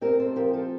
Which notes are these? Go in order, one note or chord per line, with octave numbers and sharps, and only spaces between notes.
C4 G4 A#4
A4 C5
F3 G4 A#4
F4 A4